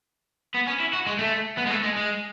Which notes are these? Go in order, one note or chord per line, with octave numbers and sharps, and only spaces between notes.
B3
C#4
E4
F#4
G#3
A3
B3
G#3
A3
G#3
G#3